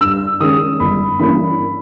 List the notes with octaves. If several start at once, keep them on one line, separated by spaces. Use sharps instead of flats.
G2 E6
D#3 G#3 C#4 D#6
G1 B5
G2 E3 A#3 C#4 B5